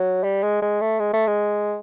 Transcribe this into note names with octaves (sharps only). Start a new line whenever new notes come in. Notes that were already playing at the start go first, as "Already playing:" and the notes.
Already playing: F#3
G3
G#3
G#3
A3
G#3
A3
G#3